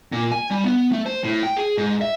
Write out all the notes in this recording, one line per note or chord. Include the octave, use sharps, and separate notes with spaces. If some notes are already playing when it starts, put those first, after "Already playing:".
A#2
G#5
G3
B3
A3
C5
A2
G5
G#4
G#2
E5